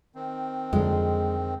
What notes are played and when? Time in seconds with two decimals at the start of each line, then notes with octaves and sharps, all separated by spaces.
0.15 D#3 C4
0.73 F2 D3 G#3